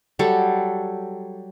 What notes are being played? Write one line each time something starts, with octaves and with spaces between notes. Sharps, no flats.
F#3 G3 A4